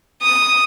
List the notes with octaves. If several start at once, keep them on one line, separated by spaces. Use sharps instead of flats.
D#6